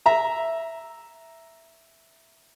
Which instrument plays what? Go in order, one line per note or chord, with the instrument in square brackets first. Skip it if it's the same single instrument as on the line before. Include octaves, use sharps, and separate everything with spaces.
[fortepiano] E5 A#5